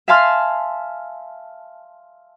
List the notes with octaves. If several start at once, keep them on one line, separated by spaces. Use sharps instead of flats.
E5 F5 G#5 A5 C6 F6